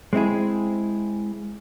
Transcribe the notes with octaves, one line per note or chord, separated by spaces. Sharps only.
G#3 C4 E4 G#4